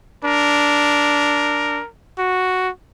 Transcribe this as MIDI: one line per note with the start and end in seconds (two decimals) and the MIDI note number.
0.24 1.80 62
0.24 1.88 70
2.19 2.69 66